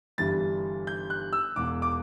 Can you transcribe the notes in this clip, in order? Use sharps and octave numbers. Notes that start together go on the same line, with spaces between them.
G1 G2 E3 G3 A6
G6
F#6
E6
E1 E2 B2 D6
D6